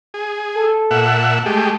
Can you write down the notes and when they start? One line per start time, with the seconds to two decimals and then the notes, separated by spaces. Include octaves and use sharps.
0.14 G#4
0.55 A4
0.91 A#2 E5 F#5
1.06 A5
1.46 G#3 A3 G4